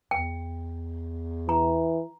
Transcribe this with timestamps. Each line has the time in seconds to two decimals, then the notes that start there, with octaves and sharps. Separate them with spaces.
0.11 E2 G5
1.49 E3 A#5